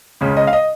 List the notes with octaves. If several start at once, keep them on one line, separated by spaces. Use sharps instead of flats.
C#2 C#3 G#3 C#4
D#5
F5
D#5